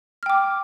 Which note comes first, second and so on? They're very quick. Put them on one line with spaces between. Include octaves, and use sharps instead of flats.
F6 G5 D6